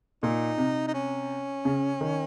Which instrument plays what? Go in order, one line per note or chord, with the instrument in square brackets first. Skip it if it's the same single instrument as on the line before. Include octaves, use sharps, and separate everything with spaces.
[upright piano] A#2 [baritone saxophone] D#4
[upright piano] C3
[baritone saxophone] D#4
C#4
[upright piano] C#3
D#3